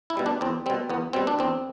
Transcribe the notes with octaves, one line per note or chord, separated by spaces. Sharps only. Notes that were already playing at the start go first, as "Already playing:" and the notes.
E4
B2 G3
D4
E2 C4
B2 G3 C4
E2 B3
B2 G3 C4
D4
E2 C4